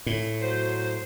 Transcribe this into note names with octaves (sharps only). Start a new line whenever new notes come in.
A2
F#3 C5